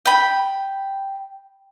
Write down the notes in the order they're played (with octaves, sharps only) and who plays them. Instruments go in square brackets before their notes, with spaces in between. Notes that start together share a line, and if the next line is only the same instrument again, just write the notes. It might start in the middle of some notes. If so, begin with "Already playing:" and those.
[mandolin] G5 B5